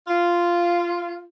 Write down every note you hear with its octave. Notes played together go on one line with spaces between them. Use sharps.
F4